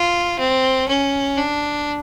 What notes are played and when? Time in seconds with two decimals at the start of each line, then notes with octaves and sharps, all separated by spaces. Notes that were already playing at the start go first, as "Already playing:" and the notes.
Already playing: F4
0.39 C4
0.88 C#4
1.37 D4